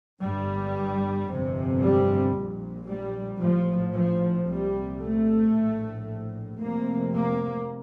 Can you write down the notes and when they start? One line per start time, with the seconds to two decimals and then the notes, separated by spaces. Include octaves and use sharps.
0.21 G1 G2 G3
1.28 G1 F2 C3
1.81 G3
2.35 A#1 A#2
2.87 G3
3.41 A#1 A2 F3
3.95 F3
4.47 C2 A#2 G3
5.01 A3
5.54 A#1 A2
6.60 F1 F2 C3 A#3
7.13 A#3